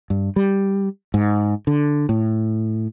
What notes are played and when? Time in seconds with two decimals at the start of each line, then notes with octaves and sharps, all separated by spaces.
0.10 G2
0.36 G3
1.14 G#2
1.67 D3
2.09 A2